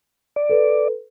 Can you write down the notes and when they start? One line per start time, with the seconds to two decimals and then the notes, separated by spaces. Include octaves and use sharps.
0.36 D5
0.49 A4 B4